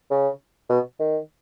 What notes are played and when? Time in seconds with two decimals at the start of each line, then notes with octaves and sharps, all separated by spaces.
0.11 C#3
0.70 B2
1.00 D#3